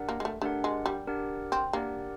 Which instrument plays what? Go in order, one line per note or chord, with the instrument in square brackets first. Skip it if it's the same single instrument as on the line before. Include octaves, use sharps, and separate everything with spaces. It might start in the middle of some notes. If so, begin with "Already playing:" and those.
Already playing: [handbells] D4 G4 A#4 D5 F#5
[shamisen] A#3
G#3
A3
[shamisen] A3 [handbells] D4 G4 A#4 D5 F#5
[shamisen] G#3
G3
[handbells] D4 G4 A#4 D5 F#5
[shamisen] C4
[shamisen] A#3 [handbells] D4 G4 A#4 D5 F#5